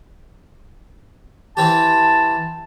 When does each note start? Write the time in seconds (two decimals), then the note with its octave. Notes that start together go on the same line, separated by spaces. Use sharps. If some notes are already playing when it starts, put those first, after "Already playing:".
1.57 E3 C4 G4 A5